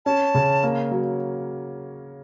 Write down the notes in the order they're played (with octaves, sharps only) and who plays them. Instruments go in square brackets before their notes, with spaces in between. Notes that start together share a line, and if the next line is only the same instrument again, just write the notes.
[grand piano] C#4 [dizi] A5
[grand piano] C#3
A#3
F#3